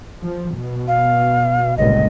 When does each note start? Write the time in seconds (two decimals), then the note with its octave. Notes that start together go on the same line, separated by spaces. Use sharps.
0.22 F3
0.55 B2
0.88 F5
1.77 G1 C#2 A#2 D#5